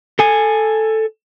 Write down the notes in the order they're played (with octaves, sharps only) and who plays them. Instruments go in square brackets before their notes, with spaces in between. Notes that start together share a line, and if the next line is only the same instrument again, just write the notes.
[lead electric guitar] A4 G#5